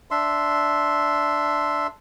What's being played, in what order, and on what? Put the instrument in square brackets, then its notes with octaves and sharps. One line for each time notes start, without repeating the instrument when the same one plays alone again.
[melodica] D4 E5 C6